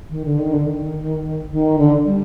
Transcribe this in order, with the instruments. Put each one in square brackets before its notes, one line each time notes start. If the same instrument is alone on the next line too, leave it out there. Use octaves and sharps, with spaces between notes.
[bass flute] D#3
D3
D#3
D3
D#3
D#3
D3
G3